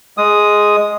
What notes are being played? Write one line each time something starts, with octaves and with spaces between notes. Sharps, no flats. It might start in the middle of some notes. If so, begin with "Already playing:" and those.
G#3 D#6